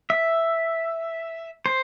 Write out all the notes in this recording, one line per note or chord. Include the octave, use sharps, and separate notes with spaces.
E5
C5